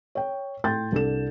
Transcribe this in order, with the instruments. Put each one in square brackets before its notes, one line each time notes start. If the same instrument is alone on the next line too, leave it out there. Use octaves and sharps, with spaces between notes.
[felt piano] C#5 G5
A2 G5 C6 G6 A6
C2 D4 A4 E7